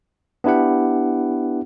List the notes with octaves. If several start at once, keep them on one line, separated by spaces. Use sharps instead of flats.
B3 D4 E4 G4 F#5